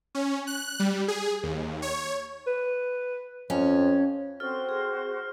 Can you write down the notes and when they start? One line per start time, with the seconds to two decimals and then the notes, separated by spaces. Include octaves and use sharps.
0.15 C#4
0.47 F#6
0.79 G3
1.08 G#4
1.43 D#2
1.82 C#5
2.47 B4
3.50 F2 C#4
4.40 C4 F#4 A4 C5 F6
4.69 G#4